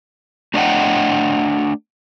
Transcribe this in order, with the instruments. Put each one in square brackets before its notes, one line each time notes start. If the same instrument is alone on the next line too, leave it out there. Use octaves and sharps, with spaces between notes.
[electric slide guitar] A3 D4 C#5 D#5 F#5 G5